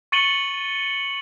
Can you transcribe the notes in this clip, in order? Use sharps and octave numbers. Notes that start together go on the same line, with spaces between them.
C#6 A6 C#7 D#7 F#7 G7